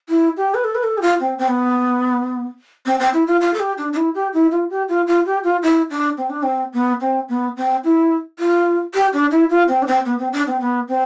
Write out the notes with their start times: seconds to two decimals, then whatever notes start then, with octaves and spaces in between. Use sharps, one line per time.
0.09 E4
0.37 G4
0.55 B4
0.64 A4
0.75 B4
0.83 A4
0.98 G4
1.02 F4
1.20 C4
1.39 C4
1.48 B3
2.86 C4
2.99 C4
3.14 E4
3.27 F4
3.41 F4
3.54 A4
3.60 G4
3.78 D4
3.93 D4
3.97 E4
4.15 G4
4.34 E4
4.52 F4
4.70 G4
4.89 F4
5.07 F4
5.26 G4
5.44 F4
5.63 E4
5.90 D4
6.18 C4
6.30 D4
6.43 C4
6.74 B3
7.01 C4
7.29 B3
7.57 C4
7.84 E4
8.39 F4
8.94 G4
9.13 D4
9.31 E4
9.50 F4
9.68 C4
9.82 D4
9.87 C4
10.06 B3
10.19 C4
10.33 D4
10.47 C4
10.61 B3
10.88 C4